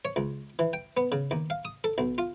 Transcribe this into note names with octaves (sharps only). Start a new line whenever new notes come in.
C#5
C#2
E3
G5
B3
C#3
D#2
F5
D#6
A4
B1
F4